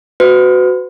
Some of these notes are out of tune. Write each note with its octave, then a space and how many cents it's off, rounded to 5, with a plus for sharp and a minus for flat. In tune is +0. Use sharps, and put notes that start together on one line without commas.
F#4 +0 B4 +35